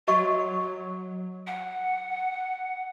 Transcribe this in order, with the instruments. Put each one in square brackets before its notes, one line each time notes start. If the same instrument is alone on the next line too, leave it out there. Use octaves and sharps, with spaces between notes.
[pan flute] F#3 [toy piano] F#4 D#5 C#6
[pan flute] F#5